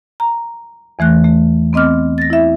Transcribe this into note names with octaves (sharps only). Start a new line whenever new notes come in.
A#5
E2 E3 A3 F#6
A3
B3 C4 D#5 D6 F6
A6 A#6
E4 E5